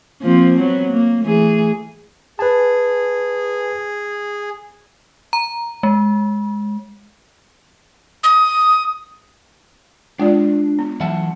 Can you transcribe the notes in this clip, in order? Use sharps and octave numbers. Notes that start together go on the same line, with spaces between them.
F3 A#3 C4
F#3 B3
A#3
E3 A3 G#4
G#4 B4 A5
A#5
G#3
D#6
G#3 D4 F4 D5
B3
E3 F#3 F#5 A5